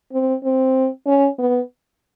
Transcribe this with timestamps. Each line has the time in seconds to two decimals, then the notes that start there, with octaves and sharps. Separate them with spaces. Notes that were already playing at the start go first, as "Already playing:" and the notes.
0.12 C4
0.44 C4
1.06 C#4
1.39 B3